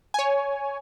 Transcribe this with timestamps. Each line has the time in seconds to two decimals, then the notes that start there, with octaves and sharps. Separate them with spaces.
0.14 C#5 G#5